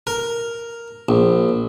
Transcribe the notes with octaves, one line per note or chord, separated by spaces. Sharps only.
A#4
A#1